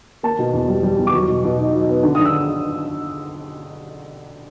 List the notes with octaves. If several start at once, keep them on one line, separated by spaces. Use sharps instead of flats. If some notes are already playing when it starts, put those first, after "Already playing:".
A#3 A5
B2
E2
G3
G3
E2
D6
F#3 C#6
B2
B2
D#4
F#3
B3
D3
D#6
D3
E6